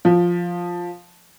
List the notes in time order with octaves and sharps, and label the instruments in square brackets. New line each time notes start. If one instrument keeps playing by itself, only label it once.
[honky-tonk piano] F3